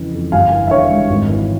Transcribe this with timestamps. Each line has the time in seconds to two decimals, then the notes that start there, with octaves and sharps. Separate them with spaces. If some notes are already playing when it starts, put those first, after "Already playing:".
Already playing: F2 C#3 E3
0.13 F2
0.32 G1 F5 G#5
0.52 E3
0.67 E5
0.71 G2 C#5 F5
0.90 G#3
1.10 G#1
1.29 E3